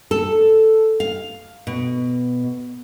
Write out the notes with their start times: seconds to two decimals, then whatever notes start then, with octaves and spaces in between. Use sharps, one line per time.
0.11 A4
1.00 F5
1.67 B2